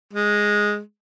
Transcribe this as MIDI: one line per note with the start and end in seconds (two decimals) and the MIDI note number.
0.13 0.79 56